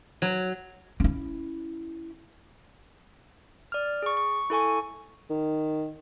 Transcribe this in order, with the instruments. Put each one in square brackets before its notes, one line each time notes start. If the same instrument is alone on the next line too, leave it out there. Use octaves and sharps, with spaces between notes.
[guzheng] F#3
[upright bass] C#4 E4
[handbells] D5 F6
G#4 C#6
C#6
E4 A4 G#5 C#6
[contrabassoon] D#3